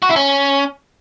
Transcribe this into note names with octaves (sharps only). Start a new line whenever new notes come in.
F#4
E4
C#4